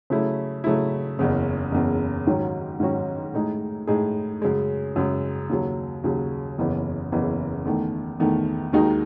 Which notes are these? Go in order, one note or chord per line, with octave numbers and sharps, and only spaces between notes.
C#3 F#3 A3 E4
C#3 F#3 A3 E4
F#1 E2 C#3
F#1 E2 C#3
G#2 D#3 F#3 C#4 F#4
G#2 D#3 F#3 C#4 F#4
A2 G#3 D#4 G#4
A2 G#3 D#4 G#4
F#2 C#3 G#3
F#2 C#3 G#3
D#2 C#3 F#3
D#2 C#3 F#3
F#1 E2 C#3 E3
F#1 E2 C#3 E3
E2 D#3 A3
E2 D#3 A3
D#2 D#3 G#3 D#4 F#4